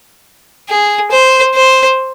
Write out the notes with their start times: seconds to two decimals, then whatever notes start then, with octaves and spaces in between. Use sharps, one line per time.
0.69 G#4
1.11 C5
1.55 C5